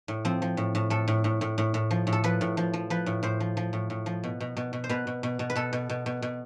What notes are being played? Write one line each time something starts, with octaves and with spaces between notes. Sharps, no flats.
A2
F3 C4
F3
A2
A2
A2 A4
A2
A2
A2
A2
A2
F3
A2
A4
F3 B4
A2
F3
F3
F3 B4
A2
A2 C5
F3
F3
A2
A2
F3
B2
B2
B2
B2
C5
B2 B4
B2
B2
B2
B4
B2 A4
B2
B2
B2
B2